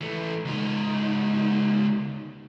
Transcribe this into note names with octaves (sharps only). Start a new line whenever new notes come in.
E3 A3
C#2 D#4